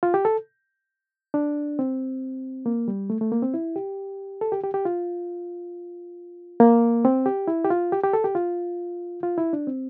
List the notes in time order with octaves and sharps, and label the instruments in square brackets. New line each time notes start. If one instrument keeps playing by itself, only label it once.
[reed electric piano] F4
G4
A4
D4
C4
A#3
G3
A3
A3
A#3
C4
E4
G4
A4
G4
G4
G4
F4
A#3
C4
G4
E4
G4
F4
G4
G4
A4
G4
F4
F4
E4
D4
C4